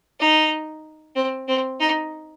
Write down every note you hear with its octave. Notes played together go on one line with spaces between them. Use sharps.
D#4
C4
C4
D#4